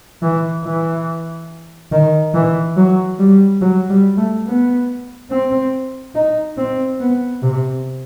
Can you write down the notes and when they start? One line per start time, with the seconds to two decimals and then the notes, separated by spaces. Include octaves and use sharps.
0.23 E3
0.65 E3
1.92 D#3
2.34 E3
2.77 F#3
3.19 G3
3.61 F#3
3.89 G3
4.17 A3
4.46 B3
5.31 C4
6.15 D#4
6.58 C4
7.00 B3
7.42 C3